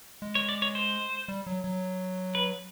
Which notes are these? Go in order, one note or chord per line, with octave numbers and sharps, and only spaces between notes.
G#3
C#5
D5
C#5
C5
G3
F#3
F#3
B4